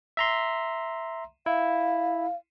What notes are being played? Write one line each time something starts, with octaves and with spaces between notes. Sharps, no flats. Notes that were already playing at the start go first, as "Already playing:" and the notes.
E5 A#5 C6
E4 F5